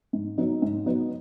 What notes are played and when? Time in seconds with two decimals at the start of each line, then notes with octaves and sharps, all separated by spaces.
0.13 G#2
0.38 F#3 B3 D#4
0.62 G#2
0.86 F#3 B3 D#4